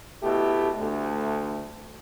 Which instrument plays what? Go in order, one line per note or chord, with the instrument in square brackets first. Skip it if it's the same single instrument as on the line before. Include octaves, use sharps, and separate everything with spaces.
[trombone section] B2 A3 E4 G4
D2 A3